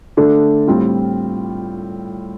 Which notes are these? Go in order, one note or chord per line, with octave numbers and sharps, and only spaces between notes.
D3 A3 D4 A4
A2 G3 C4 F4